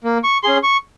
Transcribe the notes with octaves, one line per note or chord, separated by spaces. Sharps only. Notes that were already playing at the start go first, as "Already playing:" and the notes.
A#3
C#6
C#4 G#4 C6
C#6